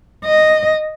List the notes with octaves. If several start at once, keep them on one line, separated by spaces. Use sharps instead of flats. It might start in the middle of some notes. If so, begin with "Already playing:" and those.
D#5